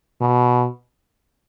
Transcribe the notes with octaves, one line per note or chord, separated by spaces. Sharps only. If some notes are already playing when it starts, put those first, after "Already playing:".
B2